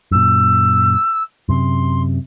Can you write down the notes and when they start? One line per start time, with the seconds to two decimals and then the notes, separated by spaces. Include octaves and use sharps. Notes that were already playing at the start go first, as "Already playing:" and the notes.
0.11 F#2 A#2 E6
1.49 F#2 C3 C6